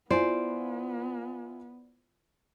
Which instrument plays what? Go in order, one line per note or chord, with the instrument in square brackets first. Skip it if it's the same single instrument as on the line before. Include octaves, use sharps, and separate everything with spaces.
[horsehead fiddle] B3 [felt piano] E4 F4 G#5 [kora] C5 [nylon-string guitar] D5